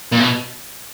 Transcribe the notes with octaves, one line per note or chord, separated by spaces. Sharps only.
A#2
B2